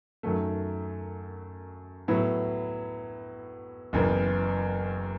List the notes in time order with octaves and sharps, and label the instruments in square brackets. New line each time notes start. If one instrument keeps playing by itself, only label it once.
[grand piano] F#2 D#3 F#3 A3
A2 F#3 B3 E4
F#1 F#2 E3 B3